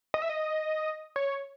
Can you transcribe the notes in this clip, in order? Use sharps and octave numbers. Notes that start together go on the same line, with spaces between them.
D#5
E5
D#5
C#5